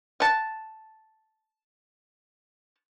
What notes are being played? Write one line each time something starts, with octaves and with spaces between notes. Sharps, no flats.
F#5 A5